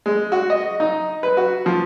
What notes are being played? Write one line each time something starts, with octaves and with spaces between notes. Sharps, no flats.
G#3
F#4
D#5
D#4
B4
F#4
F3